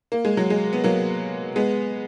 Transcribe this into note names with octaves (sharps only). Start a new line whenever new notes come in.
A#3
G#3
F#3
G#3
B3
F#3 A#3
G#3 B3